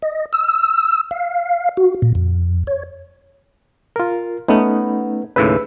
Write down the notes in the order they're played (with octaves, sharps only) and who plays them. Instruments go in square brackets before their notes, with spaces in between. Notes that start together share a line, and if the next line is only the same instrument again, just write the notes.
[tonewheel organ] D#5
E6
F5
F#4
A#2
F2
C#5
[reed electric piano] F4 A#4
[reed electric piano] A3 C#4 D#4 [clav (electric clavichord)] B3
[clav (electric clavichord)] D#2 A2 C#3 [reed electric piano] B4 E6